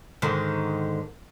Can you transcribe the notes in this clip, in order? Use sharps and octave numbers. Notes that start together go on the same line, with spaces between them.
G#2 D3 D#3